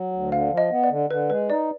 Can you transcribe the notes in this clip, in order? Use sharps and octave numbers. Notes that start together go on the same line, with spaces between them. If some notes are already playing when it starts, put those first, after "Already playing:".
Already playing: F#3
D2
D3 F5
F3
D#5
B3
D5
D3
D3 B4
G#3 B4
D#4 D5